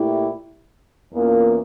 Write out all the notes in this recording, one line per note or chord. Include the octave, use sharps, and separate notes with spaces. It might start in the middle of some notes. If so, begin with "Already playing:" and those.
Already playing: A#2 A3 E4 G4
E2 E3 A#3 C#4 F4